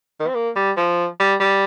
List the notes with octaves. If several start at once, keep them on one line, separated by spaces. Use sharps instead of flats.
D#3
C4
A#3
G3
F3
G3
G3